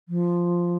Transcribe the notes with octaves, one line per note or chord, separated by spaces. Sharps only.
F3